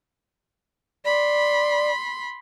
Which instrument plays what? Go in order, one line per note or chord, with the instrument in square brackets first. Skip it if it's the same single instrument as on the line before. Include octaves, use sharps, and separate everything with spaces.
[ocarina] D5 [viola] B5 C6